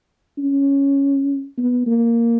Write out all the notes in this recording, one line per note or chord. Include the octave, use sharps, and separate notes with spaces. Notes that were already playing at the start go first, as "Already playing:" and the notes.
C#4
B3
A#3